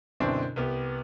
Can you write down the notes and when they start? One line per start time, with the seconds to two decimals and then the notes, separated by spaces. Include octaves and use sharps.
0.20 F#2 B2 D3 C4 D4 E4
0.56 C2 B3 G4